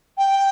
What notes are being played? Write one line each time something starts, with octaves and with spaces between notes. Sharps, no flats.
G5